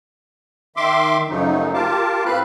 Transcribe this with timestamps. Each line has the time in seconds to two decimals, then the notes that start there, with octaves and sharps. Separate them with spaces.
0.76 D#3 E5 C6 D6
1.30 F#2 C#3 F3 F#3 A3 D#4
1.74 F4 G4 A#4 F5 A5 D6
2.25 A2 C4 B4 F5 B5 F#6